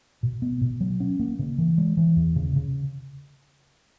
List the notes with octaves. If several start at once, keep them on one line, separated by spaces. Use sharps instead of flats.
B2
B3
B2
F#3
C#4
A#3
C#3
E3
G#3
E3
E2
C#3
C#3